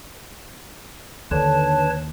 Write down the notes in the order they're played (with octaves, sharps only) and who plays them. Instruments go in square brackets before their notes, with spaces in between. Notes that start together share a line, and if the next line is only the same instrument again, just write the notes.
[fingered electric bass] D#2 [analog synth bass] D3 [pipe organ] B4 C#5 A5